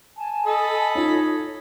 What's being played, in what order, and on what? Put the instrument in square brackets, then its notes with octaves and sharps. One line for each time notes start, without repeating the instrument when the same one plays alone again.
[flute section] G#5 A5
[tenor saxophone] A4 [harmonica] D#5 B5 D#6
[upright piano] D#4 F4 [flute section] C#5